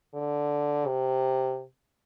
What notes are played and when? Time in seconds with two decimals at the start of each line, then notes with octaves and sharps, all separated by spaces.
0.14 D3
0.86 C3